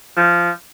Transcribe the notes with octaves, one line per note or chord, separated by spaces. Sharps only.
F3